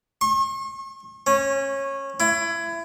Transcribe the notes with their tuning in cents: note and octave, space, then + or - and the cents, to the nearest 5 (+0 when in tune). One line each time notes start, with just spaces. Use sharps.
C#6 -45
C#4 -20
E4 +25